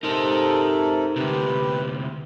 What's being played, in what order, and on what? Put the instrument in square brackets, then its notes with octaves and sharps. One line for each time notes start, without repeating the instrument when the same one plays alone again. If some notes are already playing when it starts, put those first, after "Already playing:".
[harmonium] C3 A4 A#4 [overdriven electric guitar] D#4 C5
[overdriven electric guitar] D2 C3 [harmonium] G4 B4